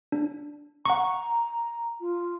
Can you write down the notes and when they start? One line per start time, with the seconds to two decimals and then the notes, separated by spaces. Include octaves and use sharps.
0.12 D4
0.85 F#5 A#5 C#6
2.01 F4